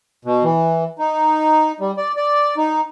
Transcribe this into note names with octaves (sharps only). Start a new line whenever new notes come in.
B2
E3
D#4
G3
D5
D5
D#4